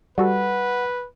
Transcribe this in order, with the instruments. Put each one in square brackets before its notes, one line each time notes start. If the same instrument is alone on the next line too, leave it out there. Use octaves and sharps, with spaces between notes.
[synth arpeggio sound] G3 F#4 A4 [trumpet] B4 [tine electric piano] F#5